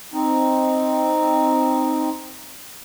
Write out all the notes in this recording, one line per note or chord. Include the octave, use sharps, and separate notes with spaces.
C4 D#4